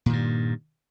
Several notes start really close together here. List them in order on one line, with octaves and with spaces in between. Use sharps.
A#2 D#3 G2